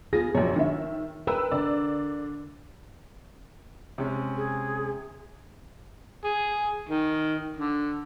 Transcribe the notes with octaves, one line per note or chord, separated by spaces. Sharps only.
B3 F4 G#4 A#6
A#1 F#2 C#5
D#3 E5
A#4 B4 G5 E6
D3 D5
C3 G#3 C#4
G#4
G#4
D#3
D3